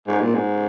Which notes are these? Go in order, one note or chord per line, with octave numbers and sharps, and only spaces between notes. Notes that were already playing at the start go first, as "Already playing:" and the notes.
G#2
A#2
G#2